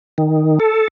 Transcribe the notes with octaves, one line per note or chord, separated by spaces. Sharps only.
D#3
A4